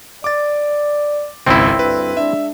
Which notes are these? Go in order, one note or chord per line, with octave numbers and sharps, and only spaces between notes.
D5 D6 A6
G#1 C#2 F#2 C4 E4
D2 G2 B4
G#3 D4 E5